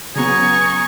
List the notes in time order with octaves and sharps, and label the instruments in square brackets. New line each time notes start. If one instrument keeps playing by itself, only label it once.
[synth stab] C#3 F#3 B3 [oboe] G#4 [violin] A#5 C#6